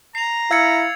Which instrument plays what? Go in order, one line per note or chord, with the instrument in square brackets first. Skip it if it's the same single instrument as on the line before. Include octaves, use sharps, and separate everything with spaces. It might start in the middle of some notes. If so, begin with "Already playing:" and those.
[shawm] A#5 [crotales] C7 F7
[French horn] E4 [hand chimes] F5 C#7 [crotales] E6 G#6 A6